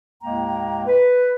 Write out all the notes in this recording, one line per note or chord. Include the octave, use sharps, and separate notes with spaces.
D#2 A2 G#3 A#3 G5 A#5
B4